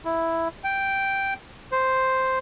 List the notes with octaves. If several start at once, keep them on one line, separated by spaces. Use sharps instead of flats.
E4
G5
C5